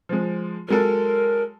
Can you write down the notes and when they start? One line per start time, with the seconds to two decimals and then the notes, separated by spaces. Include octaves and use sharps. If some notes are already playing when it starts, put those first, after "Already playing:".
0.09 F3 G#3
0.68 F#3 G#3 A4 A#4